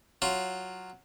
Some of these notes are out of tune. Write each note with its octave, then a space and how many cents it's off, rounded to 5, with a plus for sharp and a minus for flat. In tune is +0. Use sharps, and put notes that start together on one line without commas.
F#3 +0 F4 +0